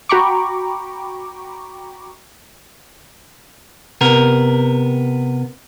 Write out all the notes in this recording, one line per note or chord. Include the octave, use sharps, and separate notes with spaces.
F#4 G5 A#5 B5 C#6 D6
C3 B3 A#4